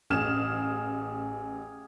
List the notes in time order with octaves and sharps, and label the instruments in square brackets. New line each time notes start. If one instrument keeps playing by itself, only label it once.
[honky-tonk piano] A1 F6 E7 [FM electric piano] A2 [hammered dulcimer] G4 G#4 F5